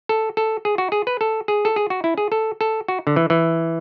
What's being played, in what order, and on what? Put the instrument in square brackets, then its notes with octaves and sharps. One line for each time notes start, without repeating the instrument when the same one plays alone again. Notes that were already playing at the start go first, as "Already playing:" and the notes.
[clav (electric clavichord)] A4
A4
G#4
F#4
G#4
B4
A4
G#4
A4
G#4
F#4
E4
G#4
A4
A4
F#4
D3
E3
E3